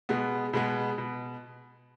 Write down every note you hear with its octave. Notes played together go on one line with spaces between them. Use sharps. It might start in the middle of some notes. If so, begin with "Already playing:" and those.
B2 G#3 B3
B2 G#3 B3
B2